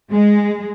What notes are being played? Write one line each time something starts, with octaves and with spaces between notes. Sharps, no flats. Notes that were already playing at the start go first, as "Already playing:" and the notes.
G#3